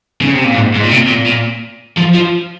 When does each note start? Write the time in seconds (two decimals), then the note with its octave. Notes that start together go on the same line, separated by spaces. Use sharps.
0.22 C#3
0.33 C3
0.44 A#2
0.55 G#2
0.75 G#2
0.84 A#2
0.91 C3
1.08 A#2
1.26 A#2
1.97 F3
2.14 F3